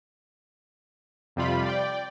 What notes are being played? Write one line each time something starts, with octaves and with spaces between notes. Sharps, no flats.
F2 C3 G3 F4 B5
D5 G5